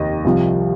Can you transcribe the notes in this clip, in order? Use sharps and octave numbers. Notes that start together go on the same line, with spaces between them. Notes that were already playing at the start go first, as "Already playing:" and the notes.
Already playing: F1 D#2 D#3 D#5
C2 C3 F3